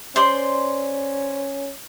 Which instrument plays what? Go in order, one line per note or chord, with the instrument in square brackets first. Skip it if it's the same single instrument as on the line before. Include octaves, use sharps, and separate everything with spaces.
[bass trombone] C#4 [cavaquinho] C5 D5 C6